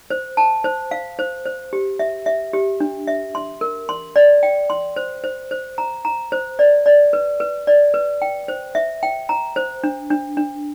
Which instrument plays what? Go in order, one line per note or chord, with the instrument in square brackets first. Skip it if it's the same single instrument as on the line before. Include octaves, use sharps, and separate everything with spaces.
[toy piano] C5
A5
C5
F5
C5
C5
G4
E5
E5
G4
D4
E5
C6
A#4
C6
D5
G5
C6
C5
C5
C5
A#5
A#5
C5
D5
D5
B4
B4
D5
B4
G5
C5
E5
G5
A#5
C5
D4
D4
D4